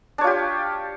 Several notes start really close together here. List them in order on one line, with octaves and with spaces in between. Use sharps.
D4 C#5 F4 G4